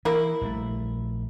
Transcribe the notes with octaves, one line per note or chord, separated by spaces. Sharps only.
E3 A#3 E4
A#1 G3 A3